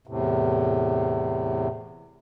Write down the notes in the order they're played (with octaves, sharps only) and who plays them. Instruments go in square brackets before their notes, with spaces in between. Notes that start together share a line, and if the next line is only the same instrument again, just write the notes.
[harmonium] E2 A2 C3